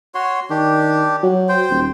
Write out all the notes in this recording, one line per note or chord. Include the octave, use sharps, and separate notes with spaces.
F#4 C#5 C6
D#3 D4 G4
F#3
C5 G5
D#1